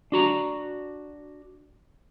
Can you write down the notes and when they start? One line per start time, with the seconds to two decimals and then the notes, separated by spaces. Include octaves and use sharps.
0.12 D4 F#4 A#5